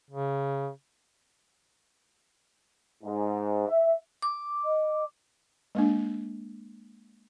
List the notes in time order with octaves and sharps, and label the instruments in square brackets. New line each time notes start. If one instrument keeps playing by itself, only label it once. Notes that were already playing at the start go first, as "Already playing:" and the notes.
[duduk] C#3
[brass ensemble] G#2
E5
[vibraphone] D6
[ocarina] D#5
[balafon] G#3 A#3 D4